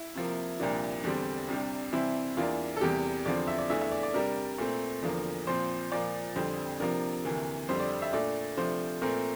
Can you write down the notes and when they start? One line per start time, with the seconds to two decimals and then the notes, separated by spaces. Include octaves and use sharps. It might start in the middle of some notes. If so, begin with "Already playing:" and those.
Already playing: E4
0.15 C3 F3 A#3
0.60 C2 A#2 F3 A#3 D4
1.04 E2 D3 G3 C4 D4
1.48 C2 C3 G3 D4
1.92 C3 E3 G3 C4 E4
2.37 E2 E3 A#3 D4 F4
2.77 A4
2.81 E2 C3 G3 A#3 G4
3.26 E2 D3 F3 C4 D5
3.47 E5
3.59 D5
3.70 E2 E3 A3 D4 E5
3.81 E5
3.92 D5
4.03 D5
4.14 C3 G3 D4 A#4
4.58 A#2 A3 C4
5.02 E2 D3 F3 A#3
5.47 A#2 F3 C4 C5
5.91 A#2 F3 A#3 D5
6.35 F2 D3 G3 C4 C5
6.80 C3 F3 A#3 D4 A#4
7.25 D2 C3 E3 A#3
7.69 F2 D3 G3 C5
7.80 D5
8.02 E5
8.13 A#2 A3 D4 D5
8.57 C3 F3 A3 D4 C5
9.02 A#2 A3 C4 A#4